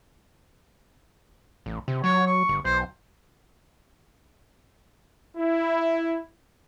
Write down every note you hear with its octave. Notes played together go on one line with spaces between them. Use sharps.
A1
C3
F#3 C#5
C#6
G1
B1 C5
E4